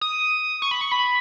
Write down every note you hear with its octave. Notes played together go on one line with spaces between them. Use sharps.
D#6
C#6
B5
C#6
B5